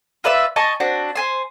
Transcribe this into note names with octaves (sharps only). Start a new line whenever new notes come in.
F4 B4 D5 E5
D#5 G#5 A5 C#6
C4 D4 F#4
C5 G#5 C6